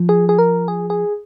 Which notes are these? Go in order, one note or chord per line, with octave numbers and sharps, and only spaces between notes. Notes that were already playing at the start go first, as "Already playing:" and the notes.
Already playing: F3
G#4
G#4
A#4
G#4
G#4